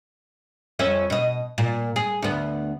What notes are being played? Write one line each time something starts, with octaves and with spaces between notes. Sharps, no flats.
F2 C#4 E5
B2 D#5
A#2
G#4
D2 B3